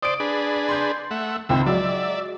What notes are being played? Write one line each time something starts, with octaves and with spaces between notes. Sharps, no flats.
C5 D5 D#6 D7
D4 G#4 B4
C6 G6
A3 E5 F#5
G#1 C#2 C4 E5 G5
F#3 G#3 D5 E5